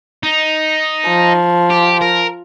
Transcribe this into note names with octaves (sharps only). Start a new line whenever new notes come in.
D#4
F3
G4
A#4